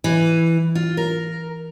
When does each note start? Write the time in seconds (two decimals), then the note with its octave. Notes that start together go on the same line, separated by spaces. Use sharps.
0.04 E3
0.75 F4
0.97 A#4